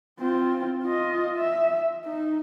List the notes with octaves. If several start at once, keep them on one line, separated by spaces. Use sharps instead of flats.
C4 F4
F4 D#5
E5
D#4